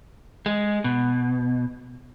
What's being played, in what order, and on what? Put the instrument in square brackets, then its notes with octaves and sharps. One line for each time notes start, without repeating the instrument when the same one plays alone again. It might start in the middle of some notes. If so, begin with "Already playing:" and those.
[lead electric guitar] G#3
B2